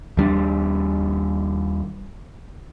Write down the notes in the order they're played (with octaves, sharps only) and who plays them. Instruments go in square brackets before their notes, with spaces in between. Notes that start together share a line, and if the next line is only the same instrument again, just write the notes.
[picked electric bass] D#2 G3 D4